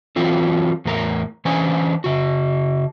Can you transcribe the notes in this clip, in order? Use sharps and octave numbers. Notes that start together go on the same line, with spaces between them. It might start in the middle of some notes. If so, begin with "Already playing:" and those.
E3 F#3 C4 F4 A4
E2 A2 A#4 A#5
E3 C#4 D4 C5 G#5
C#3 F#4